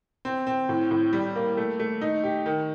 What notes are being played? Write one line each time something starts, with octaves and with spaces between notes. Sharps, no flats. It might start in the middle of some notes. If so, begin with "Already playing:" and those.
C4
C4
A2
A2
G3
A#3
A3
A3
D#4
G4
D#3